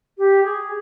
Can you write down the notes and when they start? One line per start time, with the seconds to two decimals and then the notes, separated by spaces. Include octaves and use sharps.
0.18 G4
0.43 G#4